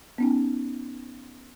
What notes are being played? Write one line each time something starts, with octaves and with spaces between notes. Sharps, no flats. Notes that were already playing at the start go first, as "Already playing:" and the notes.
B3 C#4 D#4